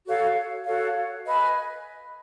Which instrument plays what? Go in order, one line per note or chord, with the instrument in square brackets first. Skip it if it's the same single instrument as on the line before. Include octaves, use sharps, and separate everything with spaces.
[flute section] F#4 A4 C#5 F5
F#4 A4 C#5 F5
B4 D#5 G#5 B5